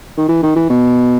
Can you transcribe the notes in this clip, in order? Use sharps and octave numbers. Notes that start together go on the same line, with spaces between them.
D#3
E3
D#3
E3
B2